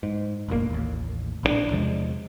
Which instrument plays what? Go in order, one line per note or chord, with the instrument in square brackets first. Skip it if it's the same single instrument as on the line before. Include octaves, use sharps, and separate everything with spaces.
[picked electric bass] G#2
F1 A#1 G#2 A#3
A1 D#2
A#1 C#3 D4
E2 C3 F3 G#3